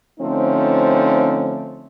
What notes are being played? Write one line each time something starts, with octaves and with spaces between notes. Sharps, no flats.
D3 F3 A3 C4 C#4 D#4